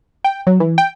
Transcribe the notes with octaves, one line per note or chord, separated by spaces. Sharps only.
G5
F#3
E3
G5